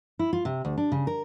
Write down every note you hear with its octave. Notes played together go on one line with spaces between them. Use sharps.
E4
F4
C3
D2
D4
C#3
A#4